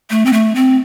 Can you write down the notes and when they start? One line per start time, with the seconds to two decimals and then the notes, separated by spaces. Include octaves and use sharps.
0.10 A3
0.26 C4
0.33 A3
0.55 C4